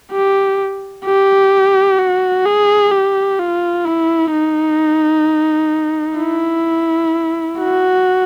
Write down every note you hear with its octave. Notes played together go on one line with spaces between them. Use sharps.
G4
G4
F#4
G#4
G4
F4
E4
D#4
E4
F#4